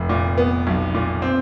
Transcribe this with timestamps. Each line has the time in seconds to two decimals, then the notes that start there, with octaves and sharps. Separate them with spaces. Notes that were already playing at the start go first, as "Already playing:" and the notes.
Already playing: F1
0.09 A#2
0.38 B3
0.67 B1
0.94 A#2
1.22 C4